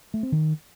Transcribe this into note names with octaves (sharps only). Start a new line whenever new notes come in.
A3
C4
D#3